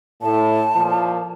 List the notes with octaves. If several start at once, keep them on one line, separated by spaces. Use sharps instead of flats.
A2 A5
A#2 F3